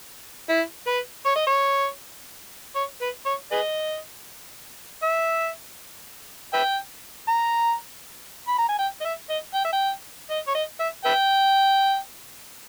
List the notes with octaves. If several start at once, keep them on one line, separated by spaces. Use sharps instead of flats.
E4
B4
C#5
D#5
C#5
C#5
B4
C#5
G#4 B4 D#5
E5
B4 E5 G5
A#5
B5
A#5
G#5
G5
D#5
E5
D#5
G5
E5
G5
D#5
C#5
D#5
E5
B4 E5 G5